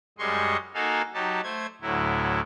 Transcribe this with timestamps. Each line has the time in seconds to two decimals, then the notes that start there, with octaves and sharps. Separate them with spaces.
0.18 F#2 G3 G#3 D#5 C6 C#6
0.74 A#3 D#4 F#4 A4 F5 G#5
1.14 F#3 D#4 G4 A5
1.43 A3 C5 G#6
1.82 D2 A2 F#3 E4